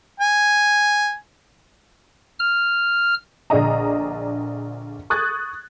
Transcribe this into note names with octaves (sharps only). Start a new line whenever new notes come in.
G#5
F6
A#1 D3 D4 G#4 D#5 A#5
C#6 D#6 F#6 G#6 A6